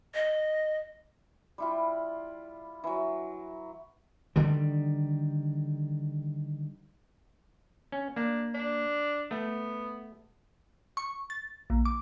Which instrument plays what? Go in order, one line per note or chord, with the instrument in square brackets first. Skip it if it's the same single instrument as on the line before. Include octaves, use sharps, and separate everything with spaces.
[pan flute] D#5
[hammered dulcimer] G3 E4 F4
E3 F#3
[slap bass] D3 D#3 G3
[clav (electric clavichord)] C#4
[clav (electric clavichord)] A#3 [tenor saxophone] D4
[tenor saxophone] D4
[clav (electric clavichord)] A3 [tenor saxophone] B3
[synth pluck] C#6
A6
A#1
D6